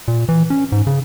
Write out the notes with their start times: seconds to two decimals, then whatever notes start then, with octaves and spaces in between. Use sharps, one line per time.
0.08 A#2
0.29 E3
0.50 C#4
0.72 G#2
0.87 C#3